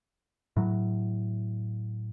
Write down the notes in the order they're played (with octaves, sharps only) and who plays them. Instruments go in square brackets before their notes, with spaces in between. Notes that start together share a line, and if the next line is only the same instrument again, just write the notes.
[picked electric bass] A2 F#3